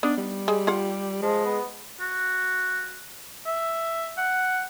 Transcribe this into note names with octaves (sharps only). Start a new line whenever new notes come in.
B3 D4 D#4
G3
G#3 G4
F4 F5 F#5
F3 G#3
B3
F#4
E5
F#5